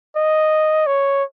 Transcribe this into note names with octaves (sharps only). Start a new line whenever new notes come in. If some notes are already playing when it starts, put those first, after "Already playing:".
D#5
C#5